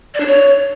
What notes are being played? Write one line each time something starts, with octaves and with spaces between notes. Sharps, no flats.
D5
D4
C#5